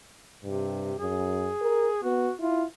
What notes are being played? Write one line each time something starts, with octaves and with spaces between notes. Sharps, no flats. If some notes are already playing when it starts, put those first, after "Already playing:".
G2 C3
F#2 G#4
A#4
B3 F#4
E4 F4